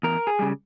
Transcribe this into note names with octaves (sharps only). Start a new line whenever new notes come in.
E2 A#4
G#4
C#3 G3